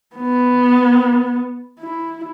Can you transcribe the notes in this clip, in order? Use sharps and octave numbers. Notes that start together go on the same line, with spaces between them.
B3
E4